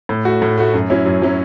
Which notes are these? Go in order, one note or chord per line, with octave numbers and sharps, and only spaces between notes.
A2
A3 F#4
A2
A3 F#4
F#2
F#3 C#4 E4
F#2
F#3 C#4 E4